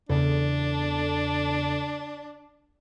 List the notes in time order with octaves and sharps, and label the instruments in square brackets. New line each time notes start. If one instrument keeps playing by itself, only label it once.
[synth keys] E2 C#3 A4 [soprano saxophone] D4